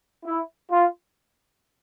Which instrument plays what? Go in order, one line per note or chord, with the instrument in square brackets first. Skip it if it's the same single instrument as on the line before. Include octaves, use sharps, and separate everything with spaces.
[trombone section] E4
F4